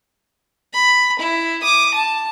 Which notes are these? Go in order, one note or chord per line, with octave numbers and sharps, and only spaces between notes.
B5
E4
D6 D#6
A5